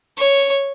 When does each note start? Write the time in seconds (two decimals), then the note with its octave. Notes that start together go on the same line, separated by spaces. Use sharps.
0.18 C#5